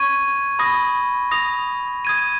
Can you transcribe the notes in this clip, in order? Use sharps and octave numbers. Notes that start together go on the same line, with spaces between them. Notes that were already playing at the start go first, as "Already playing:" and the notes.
Already playing: C#6 G#6 D#7
B5 D#6 A#6
D#6 A#6 F7
D#6 G#6 D#7